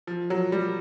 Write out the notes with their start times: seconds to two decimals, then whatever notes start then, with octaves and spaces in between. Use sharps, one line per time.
0.07 F3
0.30 F#3
0.52 G3